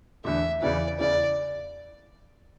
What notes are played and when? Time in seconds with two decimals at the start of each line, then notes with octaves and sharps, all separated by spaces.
0.24 E2 D3 A3 E5
0.62 E2 C#3 E3 D5
0.99 E2 C#3 E3 D5